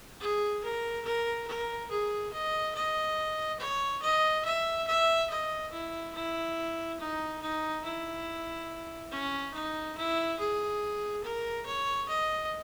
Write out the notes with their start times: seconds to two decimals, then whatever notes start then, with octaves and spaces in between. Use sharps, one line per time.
0.20 G#4
0.64 A#4
1.05 A#4
1.48 A#4
1.90 G#4
2.33 D#5
2.75 D#5
3.59 C#5
4.02 D#5
4.45 E5
4.87 E5
5.30 D#5
5.72 E4
6.15 E4
7.00 D#4
7.41 D#4
7.84 E4
9.11 C#4
9.54 D#4
9.97 E4
10.39 G#4
11.24 A#4
11.66 C#5
12.09 D#5